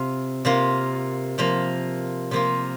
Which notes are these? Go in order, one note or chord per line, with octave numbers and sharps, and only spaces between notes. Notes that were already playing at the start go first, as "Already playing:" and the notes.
Already playing: C3 F4
C3 A#3 F4
C3 F3 A#3 F4
C3 F3 A#3 F4